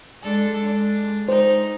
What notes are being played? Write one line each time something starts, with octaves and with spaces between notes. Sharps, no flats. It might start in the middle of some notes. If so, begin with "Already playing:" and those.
G#3 D4 A4
G#3 D4
D#4 C5